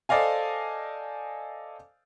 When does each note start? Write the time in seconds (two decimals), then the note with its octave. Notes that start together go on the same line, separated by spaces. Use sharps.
0.09 A4 C5 D5 D#5 F5 G#5